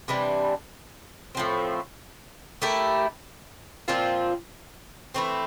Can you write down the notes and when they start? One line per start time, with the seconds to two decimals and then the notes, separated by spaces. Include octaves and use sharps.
0.08 C3 E3 G3 D4
1.35 A2 F3 C4
2.62 A3 E4 G4 A#4
3.88 A#2 F3 C4 F4
5.15 E3 A3 C4